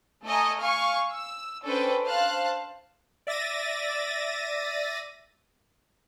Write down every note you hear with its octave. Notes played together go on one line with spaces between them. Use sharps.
A3 A4 D#5 G#5 A#5
F5 G#5 C#6 F6
E6
C#4 D4 A4 B4 C5 G5
C5 F5 A5 F#6
D5 E5 A6 A#6 D#7